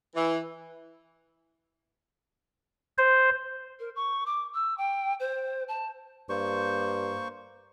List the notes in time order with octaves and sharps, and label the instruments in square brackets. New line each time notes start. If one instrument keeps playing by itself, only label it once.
[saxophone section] E3
[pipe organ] C5
[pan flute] A#4
C#6
D6
E6
G5
C5
A5
[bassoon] G2 [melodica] A#3 C5 C#6